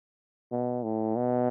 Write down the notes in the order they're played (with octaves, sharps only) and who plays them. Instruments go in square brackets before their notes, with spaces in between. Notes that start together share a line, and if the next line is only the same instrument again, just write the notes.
[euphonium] B2
A2
B2